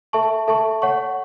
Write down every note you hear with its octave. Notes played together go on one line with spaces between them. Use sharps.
A4 E5 A5 C#6
A4 E5 A5 C#6
C#5 F#5 C#6